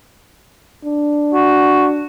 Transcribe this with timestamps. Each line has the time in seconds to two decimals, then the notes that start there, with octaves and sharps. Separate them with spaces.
0.85 D4
1.33 F#4